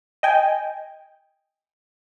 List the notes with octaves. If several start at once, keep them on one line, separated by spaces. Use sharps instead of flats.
D#5 G5 G#5